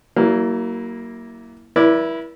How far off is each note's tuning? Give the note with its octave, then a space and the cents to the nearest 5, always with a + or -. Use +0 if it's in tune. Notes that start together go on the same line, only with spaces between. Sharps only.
F#3 +40 A#3 +0 E4 -10
E4 +0 B4 -45 D5 -5